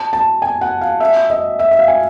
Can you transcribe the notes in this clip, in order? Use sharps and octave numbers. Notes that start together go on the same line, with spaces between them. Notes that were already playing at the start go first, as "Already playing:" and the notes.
Already playing: A5
A5
G#5
F#5
F5
E5
D#5
E5
E5
F5
G#5